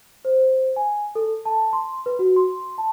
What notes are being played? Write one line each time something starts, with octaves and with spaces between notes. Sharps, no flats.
C5
G#5
A4
A5
C6
B4
F#4
C6
A5